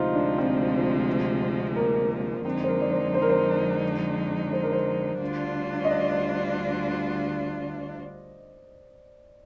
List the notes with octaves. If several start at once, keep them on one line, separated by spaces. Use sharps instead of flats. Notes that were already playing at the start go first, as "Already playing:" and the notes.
Already playing: D2 C3 F3 G#3 D#4 F4 C5
D4
C4
A#3
A#3
F2 D3 G#3 C4 D#4
C5
A#4
D5
C5
C5
A#4
C5
C5
A#4
C5
D2 D3 G3 D4 F4
D#5
D5